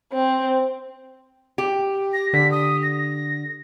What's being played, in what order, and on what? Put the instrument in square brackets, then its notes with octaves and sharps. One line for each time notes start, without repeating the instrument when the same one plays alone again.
[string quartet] C4
[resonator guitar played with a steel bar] G4
[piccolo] A#6
[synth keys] D3 [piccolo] B6
[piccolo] D#6
A#6